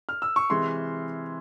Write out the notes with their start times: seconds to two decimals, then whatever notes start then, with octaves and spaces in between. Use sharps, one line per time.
0.09 F6
0.22 E6
0.36 C#6
0.50 C3 E3 G#3 C6